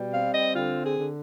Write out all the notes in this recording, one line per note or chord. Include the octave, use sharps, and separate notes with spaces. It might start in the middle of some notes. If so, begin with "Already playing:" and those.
Already playing: B2 G3
C4 F5
D#5
D3 F4
G#4
D3